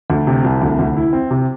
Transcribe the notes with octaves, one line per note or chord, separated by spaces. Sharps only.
D2
C3
C2
D2
D2
E4
C4
C3